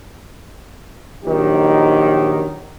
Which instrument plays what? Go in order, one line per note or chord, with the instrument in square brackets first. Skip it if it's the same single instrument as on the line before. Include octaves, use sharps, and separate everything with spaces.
[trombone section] A#1 D#3 F#3 D#4 G4